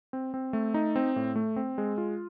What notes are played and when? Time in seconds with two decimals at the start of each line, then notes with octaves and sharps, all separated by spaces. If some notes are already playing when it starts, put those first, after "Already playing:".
0.13 C4
0.34 C4
0.53 A3
0.74 D#4
0.96 C4
1.16 A2
1.36 A3
1.56 C4
1.78 G#3
1.98 F4